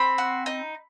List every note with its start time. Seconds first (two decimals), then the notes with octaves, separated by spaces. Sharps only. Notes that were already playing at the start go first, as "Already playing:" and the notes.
Already playing: C4 B5
0.18 F#4
0.46 D#4